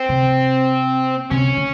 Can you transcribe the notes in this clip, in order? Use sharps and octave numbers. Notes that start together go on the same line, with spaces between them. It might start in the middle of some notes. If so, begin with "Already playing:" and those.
Already playing: C4
C3
C3 C#4
C#3